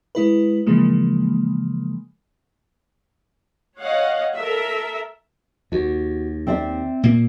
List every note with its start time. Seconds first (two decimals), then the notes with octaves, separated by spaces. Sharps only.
0.15 G#3 E4 B4
0.66 C#3 E3 F3 G#3 A#3
3.78 C#5 D#5 F5 F#5
4.35 A4 A#4 E5
5.72 D#2 F#4
6.47 C4 D5 E5
7.03 A#2 A#3